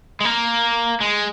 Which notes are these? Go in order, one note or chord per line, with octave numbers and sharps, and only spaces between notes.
G#3
A#3
G#3